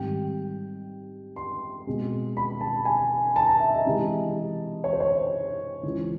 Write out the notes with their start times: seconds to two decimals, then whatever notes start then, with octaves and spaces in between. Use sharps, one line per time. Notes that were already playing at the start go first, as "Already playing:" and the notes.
Already playing: G#2 D#3 G3 C4 G5
1.36 C6
1.87 B2 G#3 C4
2.37 B5
2.61 A5
2.85 G#5
3.36 A5
3.47 A#5
3.60 E5
3.73 D#5
3.85 C3 E3 G#3
4.84 C#5
4.93 C5
5.00 C#5
5.83 C#2 C#3 E3